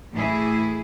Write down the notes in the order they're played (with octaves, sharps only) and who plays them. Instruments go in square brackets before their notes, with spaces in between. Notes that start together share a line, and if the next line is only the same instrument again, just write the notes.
[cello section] A2 E3 A3 E4 G#4